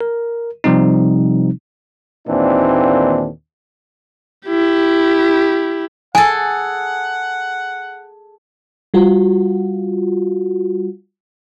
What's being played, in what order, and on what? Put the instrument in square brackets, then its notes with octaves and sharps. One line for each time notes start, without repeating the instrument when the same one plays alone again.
[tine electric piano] A#4
C3 F3 G3 C4 D#4
[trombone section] D#2 A#2 D#3 E3 C4 D4
[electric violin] E4 G4
[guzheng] G#4 A4 [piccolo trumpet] F#5 [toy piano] G#5
[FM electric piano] G3 F4 F#4